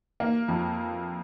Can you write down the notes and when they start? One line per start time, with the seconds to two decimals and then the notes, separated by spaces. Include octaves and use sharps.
0.20 A#3
0.48 F2